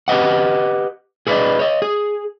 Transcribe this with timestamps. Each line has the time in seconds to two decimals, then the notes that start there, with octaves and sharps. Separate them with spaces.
0.08 G4 B4 D#5 F#5
1.27 G#4 A4 B4 C5 D5 D#5
1.59 C#5 D#5
1.82 G#4